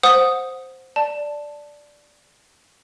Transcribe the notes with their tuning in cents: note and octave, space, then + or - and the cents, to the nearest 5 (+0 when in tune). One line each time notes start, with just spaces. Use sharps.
C5 +0 F#5 -20 D#6 +0
D5 +0 A5 +0